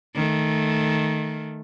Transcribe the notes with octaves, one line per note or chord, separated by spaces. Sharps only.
D#3 A3